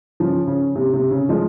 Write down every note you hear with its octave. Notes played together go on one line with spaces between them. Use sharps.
C#3 F3
C#3
C3
C3
C#3
F3 G#3